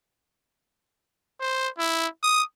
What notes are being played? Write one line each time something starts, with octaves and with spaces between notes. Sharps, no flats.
C5
E4
D#6